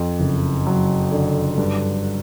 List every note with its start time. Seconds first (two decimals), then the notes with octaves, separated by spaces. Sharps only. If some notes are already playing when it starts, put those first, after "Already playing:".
Already playing: F2
0.20 F#1
0.66 F#3
1.12 D3
1.58 G2